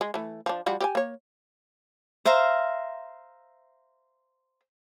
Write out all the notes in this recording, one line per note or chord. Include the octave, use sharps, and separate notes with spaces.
G#3
E3 A3
F3 D4
F3 G3 F#4
G4 D#5 G#5
A#3 C#5
C5 E5 F5 A#5